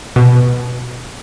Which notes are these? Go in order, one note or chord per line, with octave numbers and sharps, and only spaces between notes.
B2